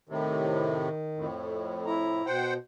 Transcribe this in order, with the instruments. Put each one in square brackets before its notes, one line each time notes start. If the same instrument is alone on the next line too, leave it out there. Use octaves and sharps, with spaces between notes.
[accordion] A2 C3 [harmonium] D#3
[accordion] F2 A2
[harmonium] E4 A#5
[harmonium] B2 [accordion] C5 F#5 G5